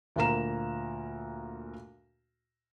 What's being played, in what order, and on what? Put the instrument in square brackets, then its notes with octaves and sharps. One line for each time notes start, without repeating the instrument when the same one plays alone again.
[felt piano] D2 A#2 A#3 A#4 A#5 E7